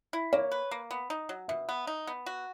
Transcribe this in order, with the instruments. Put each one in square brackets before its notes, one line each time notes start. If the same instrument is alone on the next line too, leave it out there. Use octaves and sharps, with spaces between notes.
[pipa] E4
[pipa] A#3 [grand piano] C#5
[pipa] B4
A#3
B3
D#4
F#3
[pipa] B2 [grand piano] E5
[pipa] B3
D#4
B3
F#4